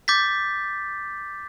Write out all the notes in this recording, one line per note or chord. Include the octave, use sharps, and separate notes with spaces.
D6 G6 A6 B6